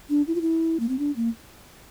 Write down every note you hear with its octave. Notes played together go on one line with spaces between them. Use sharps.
D4
E4
F4
E4
A#3
C4
D4
A#3